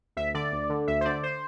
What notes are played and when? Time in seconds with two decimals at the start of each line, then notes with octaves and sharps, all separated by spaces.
0.17 D2 E5
0.34 D3 D5
0.52 D2
0.70 D3
0.88 D2 E5
1.01 C5
1.05 D3 D5
1.23 C5